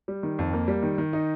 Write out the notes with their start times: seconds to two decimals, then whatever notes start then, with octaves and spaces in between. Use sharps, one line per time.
0.08 G3
0.23 D#3
0.39 F2
0.53 A#3
0.68 G3
0.83 D#3
0.98 D#3
1.13 D#4